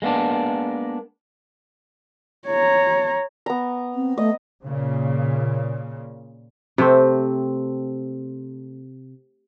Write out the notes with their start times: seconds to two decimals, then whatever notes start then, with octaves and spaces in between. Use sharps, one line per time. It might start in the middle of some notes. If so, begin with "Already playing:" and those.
0.02 G#3 A#3 B3 D4
2.47 C#5 A#5
3.46 B3 A#5
3.95 C4
4.17 A3 D#5
4.64 A#2 C#3
6.78 C3 A3 C4